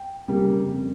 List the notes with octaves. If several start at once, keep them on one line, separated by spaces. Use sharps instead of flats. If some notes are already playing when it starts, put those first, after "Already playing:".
Already playing: G5
C#3 G3 A#3
F2